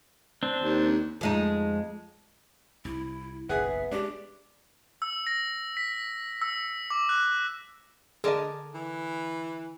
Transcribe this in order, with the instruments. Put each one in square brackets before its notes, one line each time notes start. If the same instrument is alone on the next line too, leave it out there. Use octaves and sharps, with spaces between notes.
[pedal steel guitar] C4 D4
[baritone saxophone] D#2
[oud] F2 G#3 D#4
[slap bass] C2 [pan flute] E4
[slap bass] F#1 B1 E2 [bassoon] B3 [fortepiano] G#4 F#5 [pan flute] E5
[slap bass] G#3 [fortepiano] D4 [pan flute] G4
[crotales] E6
A#6
B6
E6
D6
F#6
[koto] D3 A#4 A5 [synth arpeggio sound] G#4 D5 D#5
[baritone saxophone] E3